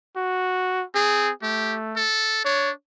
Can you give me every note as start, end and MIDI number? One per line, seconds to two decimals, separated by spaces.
0.16 0.84 66
0.95 1.31 60
0.95 1.31 68
1.43 2.05 57
1.43 1.76 67
1.96 2.43 69
2.45 2.71 62
2.45 2.71 73